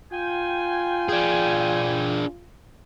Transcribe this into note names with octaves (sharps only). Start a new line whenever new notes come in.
F4 G5 G#5
D4 G#4